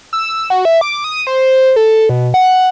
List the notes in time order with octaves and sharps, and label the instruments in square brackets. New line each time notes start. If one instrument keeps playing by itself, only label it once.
[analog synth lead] E6
F#4
E5
D6
D#6
C5
A4
B2
F#5